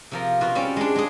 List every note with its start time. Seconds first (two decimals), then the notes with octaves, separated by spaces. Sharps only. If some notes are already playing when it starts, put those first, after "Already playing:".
0.12 C3 F3 A#4
0.41 B2 F4 F#4
0.55 G3 C4 C#4
0.76 G#3 D4
0.96 G#3 G#4